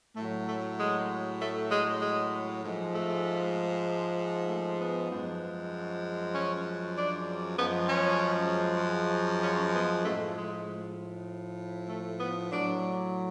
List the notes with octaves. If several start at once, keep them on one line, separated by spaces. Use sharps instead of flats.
A2 F#3 A3
A3
G#3
A3
G#3
G#3
G#2 F3 G#3
A3
A3
B3
F#2 F3 G#3
C#4
D4
F#2 F3 G#3 B3
C#4
C#4
B3
A2 F3 G#3 A3
G#3
A3
B3
A2 F#3 D4